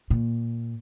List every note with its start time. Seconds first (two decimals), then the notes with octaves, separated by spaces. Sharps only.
0.10 A#2